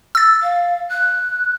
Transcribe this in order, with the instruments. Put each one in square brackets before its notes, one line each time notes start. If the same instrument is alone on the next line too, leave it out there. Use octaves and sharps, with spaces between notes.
[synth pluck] E6 A6
[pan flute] F5
F#6